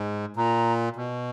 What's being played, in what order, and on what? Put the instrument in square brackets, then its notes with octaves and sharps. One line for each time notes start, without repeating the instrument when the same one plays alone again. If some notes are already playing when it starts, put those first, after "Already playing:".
Already playing: [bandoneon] G#2
[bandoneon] A#2 [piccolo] A#5
[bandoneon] B2